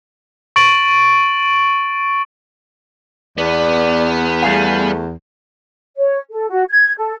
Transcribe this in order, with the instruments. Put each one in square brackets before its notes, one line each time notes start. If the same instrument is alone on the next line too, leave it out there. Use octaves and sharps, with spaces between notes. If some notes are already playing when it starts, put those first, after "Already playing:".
[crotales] C#6 A6 D7 F#7
[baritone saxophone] E2 [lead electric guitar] B3 [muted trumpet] D5
[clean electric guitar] G3 G#4 F5 [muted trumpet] A3
[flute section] C#5
A4
F#4
G#6
A4